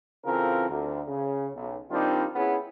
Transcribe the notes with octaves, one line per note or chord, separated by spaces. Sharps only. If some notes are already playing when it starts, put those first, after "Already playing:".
C#3 E3 C4 F4 A4 A#4
D2
C#3
B1
D#3 G3 C4 D4 D#4 F4
B3 C#4 E4 G#4